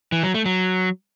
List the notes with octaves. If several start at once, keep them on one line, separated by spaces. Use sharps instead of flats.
E3
F#3
A3
F#3